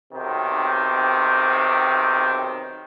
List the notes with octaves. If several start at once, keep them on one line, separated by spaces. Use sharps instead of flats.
B1 C3 D#3 C4